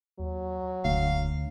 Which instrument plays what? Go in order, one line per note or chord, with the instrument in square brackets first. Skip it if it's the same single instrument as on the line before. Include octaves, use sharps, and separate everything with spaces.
[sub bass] D#2 [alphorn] F#3
[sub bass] E1 [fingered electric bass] D2 [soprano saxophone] F5